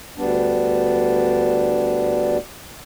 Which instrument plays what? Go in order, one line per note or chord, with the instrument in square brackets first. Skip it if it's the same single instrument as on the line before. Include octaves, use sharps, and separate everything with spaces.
[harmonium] D2 G3 B3 D4